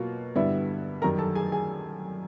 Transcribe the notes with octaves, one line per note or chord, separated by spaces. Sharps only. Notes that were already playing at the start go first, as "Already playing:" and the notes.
Already playing: B2 F#3 A#3 F4
G2 D3 G3 B3 E4 E5
F#2 D#3 G3 A#4 A#5
A4 A5
G#4 G#5
G#4 G#5